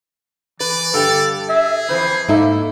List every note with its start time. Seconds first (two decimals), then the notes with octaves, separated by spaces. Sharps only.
0.60 E3 B4 D5
0.94 G2 D3 G4 A4
1.49 G#4 E5
1.89 F2 E3 B4 C5
2.28 G#2 A3 A#3 D#4 E4 A4 E5